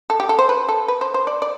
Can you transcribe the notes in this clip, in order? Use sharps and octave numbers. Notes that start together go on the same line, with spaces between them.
A4
G4
A4
C5
B4
A4
B4
C5
C5
D5
D5